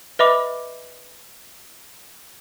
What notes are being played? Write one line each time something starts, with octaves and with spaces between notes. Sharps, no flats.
B4 D#5 E5 B5 D6